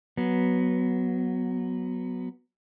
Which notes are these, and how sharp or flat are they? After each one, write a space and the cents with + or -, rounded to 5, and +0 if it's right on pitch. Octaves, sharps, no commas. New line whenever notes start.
F#3 +0 B3 +0